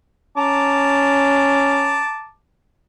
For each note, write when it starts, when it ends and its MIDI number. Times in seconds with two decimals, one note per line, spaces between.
0.37 2.05 61
0.37 2.30 81
0.37 2.30 82
0.37 2.30 86